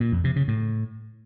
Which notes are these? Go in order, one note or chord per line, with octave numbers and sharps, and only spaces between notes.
A#2
F2
C3
C#3
A2